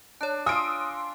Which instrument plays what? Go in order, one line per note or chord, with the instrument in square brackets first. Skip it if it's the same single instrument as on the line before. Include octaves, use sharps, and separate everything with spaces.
[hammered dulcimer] D4 [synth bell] C#5 A5
[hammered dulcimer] F4 C6 [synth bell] F5 G#5 [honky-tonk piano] D#6 E6 D7